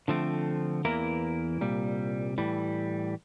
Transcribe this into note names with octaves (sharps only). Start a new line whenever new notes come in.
D3 F3 A3 C4
E2 E3 A#3 E4 A#4
C2 A#2 G3
A2 E3 G3